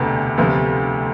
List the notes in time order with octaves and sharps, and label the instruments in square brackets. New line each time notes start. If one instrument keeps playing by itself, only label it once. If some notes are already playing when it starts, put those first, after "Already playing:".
Already playing: [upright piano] E1 D2 C3 B3
D2 C3 F3 B3 F4